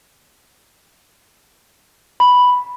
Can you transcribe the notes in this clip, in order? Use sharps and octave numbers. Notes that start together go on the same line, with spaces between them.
B5